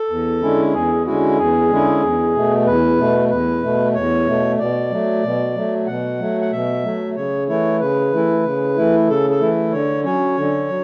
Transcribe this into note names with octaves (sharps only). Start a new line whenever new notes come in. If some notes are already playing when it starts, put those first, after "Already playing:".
Already playing: A4
E2
D3 G#3 C#4 E4
E2 G#4
D3 G#3 C#4 E4 F#4
E2 G#4
D3 G#3 C#4 E4
E2
B2 A3
E2 B4
B2 A3
E2 B4
B2 A3
E2 C#5
B2 A3
B2 D5
F#3 A3
B2
F#3 A3
B2 F#5
F#3 A3
F#5
B2 E5
F#3 A3
C#3 C#5
E3 A3 E4 C#5
C#3 B4
E3 A3 E4
C#3
E3 A3 E4
C#3 A4
A4
E3 A3 E4
D3 C#5
F#3 C#4 C#5
D3
F#3